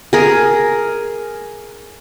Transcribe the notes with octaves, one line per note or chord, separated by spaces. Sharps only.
G#4 A#4